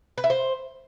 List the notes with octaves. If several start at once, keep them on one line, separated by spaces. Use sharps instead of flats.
B4
E4
C5